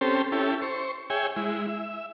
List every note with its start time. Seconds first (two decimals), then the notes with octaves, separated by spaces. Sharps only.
0.01 C4 C#4 G4 A4 C5
0.32 C#4 E4 G4 A4
0.62 C5 C#6
1.10 G#4 C#5 E5 G5 G#5
1.36 G#3 E4
1.68 E5